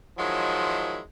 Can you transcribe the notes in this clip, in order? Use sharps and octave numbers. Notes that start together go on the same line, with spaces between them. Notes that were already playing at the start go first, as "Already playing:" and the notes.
D#3 F3 F#3 G#3 E4